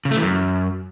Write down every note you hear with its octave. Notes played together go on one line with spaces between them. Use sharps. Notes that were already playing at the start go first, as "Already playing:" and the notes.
C#3
A3
E3
F#2